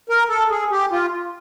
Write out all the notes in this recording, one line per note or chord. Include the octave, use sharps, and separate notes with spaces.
A#4
A4
G#4
G4
F4